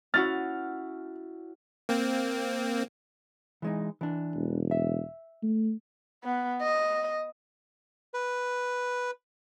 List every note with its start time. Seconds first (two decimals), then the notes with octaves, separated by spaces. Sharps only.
0.14 C#4 E4 F#4 F6 A6
1.89 A#3 C4
3.62 E3 G#3 D#4
4.01 E3 D4
4.35 E1
4.71 E5
5.43 A3
6.24 B3
6.62 D#5
8.14 B4